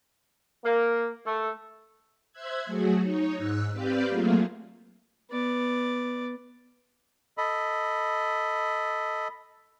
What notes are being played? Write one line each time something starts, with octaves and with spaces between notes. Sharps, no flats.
A#3
A3
C5 E5 E6 F#6 G#6
F#3 A3 F#4 G#4
D#4 C#5
G#2 E6 F#6
C4 G4 B4 D5 F5 G6
F#3 A3 A#3 F4 G#4
B3 D5
A4 D#5 B5